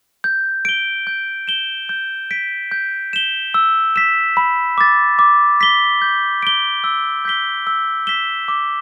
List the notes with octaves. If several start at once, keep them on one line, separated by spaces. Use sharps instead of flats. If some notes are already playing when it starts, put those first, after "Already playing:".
G6
D7 G7
G6
E7 G7
G6
B6 D7
G6
E7 G7
E6
B6 E7
B5
D6 A6
D6
B6 G7
G6
D7 G7
E6
G6 B6 G7
E6
B6 E7 G7
D6